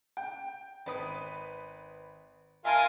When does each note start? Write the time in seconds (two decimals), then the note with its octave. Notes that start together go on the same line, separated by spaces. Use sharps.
0.17 G5
0.86 G#1 B4 D#6
2.65 F4 A#4 E5 G#5 A5 C6